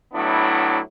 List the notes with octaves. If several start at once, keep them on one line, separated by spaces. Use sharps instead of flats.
A2 F#3 B3 D4 E4